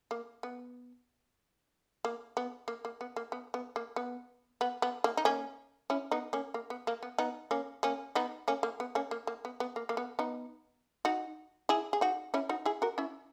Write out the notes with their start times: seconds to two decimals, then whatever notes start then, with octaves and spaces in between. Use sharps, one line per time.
0.11 A#3
0.43 B3
2.05 A#3
2.37 B3
2.68 A#3
2.85 A#3
3.01 B3
3.16 A#3
3.32 B3
3.54 B3
3.76 A#3
3.96 B3
4.61 B3
4.82 B3
5.04 A#3
5.17 D#4
5.25 A#3 C#4
5.90 C#4 E4
6.11 B3 D#4
6.33 A#3 C#4
6.54 A#3
6.70 B3
6.87 A#3
7.03 B3
7.18 B3 D#4
7.51 A#3 C#4
7.83 A#3 C#4
8.15 B3 D#4
8.48 A#3 C#4
8.63 A#3
8.80 B3
8.95 A#3 C#4
9.11 A#3
9.27 A#3
9.45 B3
9.60 B3
9.76 A#3
9.89 A#3
9.97 B3
10.19 B3 D#4
11.05 D#4 F#4
11.69 E4 G#4
11.93 G#4
12.01 D#4 F#4
12.34 C#4 E4
12.49 D#4 F#4
12.65 E4 G#4
12.82 F#4 A#4
12.98 C#4 E4